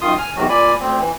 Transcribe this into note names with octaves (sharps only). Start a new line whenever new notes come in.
F#2 D#3 F4 C6 D#6
G#5 F6
E2 C3 D#3 F#3 F#4
A#2 D5 G#5 B5
D2 C4
E3